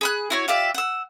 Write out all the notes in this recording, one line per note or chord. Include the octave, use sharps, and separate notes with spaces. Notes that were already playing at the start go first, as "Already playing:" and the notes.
G#4 B5 F#6
E4 F#4 C#5
F4 G4 D5 E5
F#5 E6